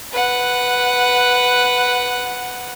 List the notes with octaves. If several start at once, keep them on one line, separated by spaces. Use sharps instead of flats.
B4 F#5